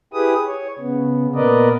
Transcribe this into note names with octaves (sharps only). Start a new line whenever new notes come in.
E4 G4 G#4 B4 D#6
C#5
C#3 B3
A#2 B3 A#4 B4 D5 D#5